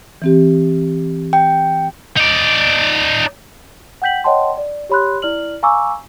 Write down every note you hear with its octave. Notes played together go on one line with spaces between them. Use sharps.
E3 C4 G4
G5
D#4 D5
F#5 G5 G6 B6 F#7
C#5 D#5 F#5 G5 A5 C6
D5
G4 C#5 B5 C6 F#6
E4 D5 F6 F#7
F5 G#5 A#5 C#6 D6 E6